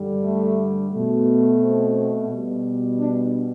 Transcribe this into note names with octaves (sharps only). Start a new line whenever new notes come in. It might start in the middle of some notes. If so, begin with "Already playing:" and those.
Already playing: G2 D3 G3
A3
A3
B2
C4
B2 G3
D4